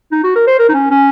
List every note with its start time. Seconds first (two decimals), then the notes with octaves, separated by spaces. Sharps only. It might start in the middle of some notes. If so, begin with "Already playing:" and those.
0.12 D#4
0.24 F#4
0.35 A#4
0.47 C5
0.59 A#4
0.69 D#4
0.74 C#4
0.91 C#4